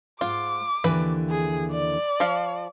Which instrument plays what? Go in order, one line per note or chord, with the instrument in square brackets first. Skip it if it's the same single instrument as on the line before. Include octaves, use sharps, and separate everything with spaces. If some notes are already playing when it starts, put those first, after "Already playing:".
[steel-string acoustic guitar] G#2 [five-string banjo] F4 [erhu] D6
[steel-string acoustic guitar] D#2 D3 E3 [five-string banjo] B4
[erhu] G#4
D5
[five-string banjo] F3 F5